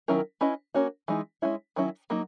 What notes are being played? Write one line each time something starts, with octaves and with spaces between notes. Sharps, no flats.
D#3 F#3 C#4 E4 A#4
C#4 E4 B4 D#5
A#3 C#4 F#4
E3 G#3 D#4
G#3 C#4 E4
D#3 F#3 C#4 E4
F#3 A#3 D#4